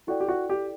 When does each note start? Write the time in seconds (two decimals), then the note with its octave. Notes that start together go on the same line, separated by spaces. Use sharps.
0.07 E4 F#4 A4 D5 G5
0.20 G4
0.29 F#4
0.50 G4